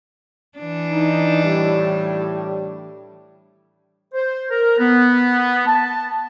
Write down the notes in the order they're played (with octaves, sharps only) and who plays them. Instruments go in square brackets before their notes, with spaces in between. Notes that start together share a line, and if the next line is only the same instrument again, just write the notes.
[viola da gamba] E3 D4
[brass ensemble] D#4
A2 G3
[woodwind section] C5
A#4
B3
A5